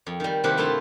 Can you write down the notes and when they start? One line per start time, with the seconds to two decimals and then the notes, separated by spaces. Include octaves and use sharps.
0.07 F2
0.20 D#3 G3
0.44 C3 D#3 A#3 E4 B4 F#5
0.57 G2 A3 E4 F4 C5 A5